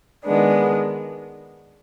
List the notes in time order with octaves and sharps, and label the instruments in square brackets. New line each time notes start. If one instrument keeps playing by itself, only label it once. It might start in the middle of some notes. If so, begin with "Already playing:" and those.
[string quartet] D#3 G#3 B3 D4